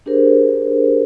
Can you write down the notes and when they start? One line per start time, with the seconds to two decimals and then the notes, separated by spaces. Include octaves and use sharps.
0.06 D4 G4 G#4 A#4 C5